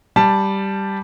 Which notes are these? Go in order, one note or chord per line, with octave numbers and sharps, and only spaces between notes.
G3 A5